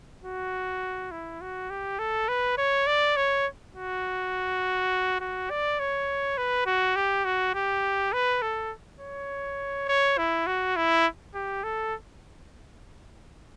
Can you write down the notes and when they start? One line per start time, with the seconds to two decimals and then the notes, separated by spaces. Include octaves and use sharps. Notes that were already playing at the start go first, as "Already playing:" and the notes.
0.24 F#4
1.11 E4
1.41 F#4
1.70 G4
1.99 A4
2.28 B4
2.58 C#5
2.87 D5
3.16 C#5
3.75 F#4
5.20 F#4
5.50 D5
5.80 C#5
6.38 B4
6.66 F#4
6.96 G4
7.25 F#4
7.54 G4
8.13 B4
8.42 A4
9.00 C#5
9.88 C#5
10.18 E4
10.47 F#4
10.76 E4
11.34 G4
11.64 A4